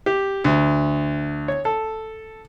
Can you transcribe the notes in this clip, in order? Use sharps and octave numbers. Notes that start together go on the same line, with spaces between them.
G4
D2
C#5
A4